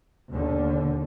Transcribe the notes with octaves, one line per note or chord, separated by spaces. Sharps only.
D#2 B2 D3